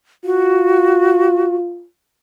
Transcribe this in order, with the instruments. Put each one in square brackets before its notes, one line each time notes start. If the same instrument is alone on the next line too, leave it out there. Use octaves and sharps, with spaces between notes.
[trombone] F4 [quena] F#4